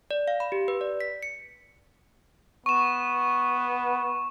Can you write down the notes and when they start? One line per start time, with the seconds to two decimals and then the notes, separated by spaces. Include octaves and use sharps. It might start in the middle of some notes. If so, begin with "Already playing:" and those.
0.11 D5
0.28 F5
0.40 B5
0.52 G4
0.68 B4
0.81 D5
1.01 B6
1.23 C#7
2.66 B3 C#6 E7